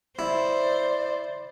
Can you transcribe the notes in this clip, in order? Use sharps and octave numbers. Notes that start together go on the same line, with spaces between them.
E4 C5 D5